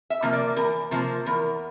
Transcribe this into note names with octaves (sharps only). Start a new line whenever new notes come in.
E5
C3 F3 A#3
D5
E2 A#4
C3 F3 A#3 C5
E2 A#4